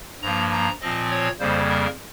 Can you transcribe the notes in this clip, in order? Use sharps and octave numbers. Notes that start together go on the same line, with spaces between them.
G2 F3 A#3 A#5
A#5
A#2 F3 C4 D#5
C#5
F2 C#3 G3 A#3 C5
A#4